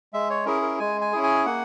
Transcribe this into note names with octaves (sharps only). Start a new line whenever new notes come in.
G#3 E5
C#5
C#4 E4 G#4 A#4
A#4
G#3 G#5
G#5
C#4 E4 G#4
G#5
A#3 F#5